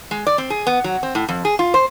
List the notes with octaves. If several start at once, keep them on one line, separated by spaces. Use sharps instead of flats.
G#3
D5
C4
G#4
B3
F#3
C4
A2
F2
G#4
F4
C5